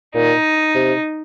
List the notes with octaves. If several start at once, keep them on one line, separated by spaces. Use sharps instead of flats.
A#2 D#4
C3